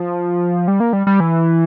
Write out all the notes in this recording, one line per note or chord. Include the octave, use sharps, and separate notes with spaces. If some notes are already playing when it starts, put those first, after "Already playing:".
Already playing: F3
G3
A#3
G3
G3
E3